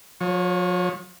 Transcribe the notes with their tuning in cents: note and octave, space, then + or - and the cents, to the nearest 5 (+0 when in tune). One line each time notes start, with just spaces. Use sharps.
F3 +45 C#5 +0